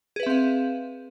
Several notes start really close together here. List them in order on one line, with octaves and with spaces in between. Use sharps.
G#4 B4 E5 C4 F5